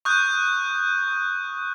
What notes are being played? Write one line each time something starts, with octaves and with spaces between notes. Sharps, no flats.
C#6 D#6 F#6 G6